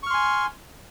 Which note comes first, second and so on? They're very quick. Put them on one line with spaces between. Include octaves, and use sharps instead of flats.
C#6 F6 C6 G#5